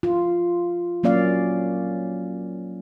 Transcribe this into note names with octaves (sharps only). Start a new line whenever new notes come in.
F4
F#3 A#3 C#4 D5 F5